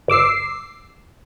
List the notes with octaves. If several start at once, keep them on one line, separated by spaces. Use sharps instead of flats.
G1 D6 E6 C7